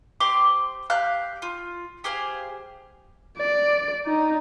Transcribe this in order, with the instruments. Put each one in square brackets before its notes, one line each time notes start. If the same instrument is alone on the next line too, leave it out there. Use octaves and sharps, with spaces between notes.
[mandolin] G4 C5 C6 D6
G4 F5 F#6 G6
F4
G4 G#4 C5 F5
[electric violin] D5
D#4